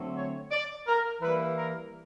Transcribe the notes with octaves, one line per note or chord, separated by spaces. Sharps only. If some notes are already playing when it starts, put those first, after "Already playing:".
Already playing: D3 F#3 A3 C4
C#5
D5
A#4
E3 G3 A#3 B4
A#4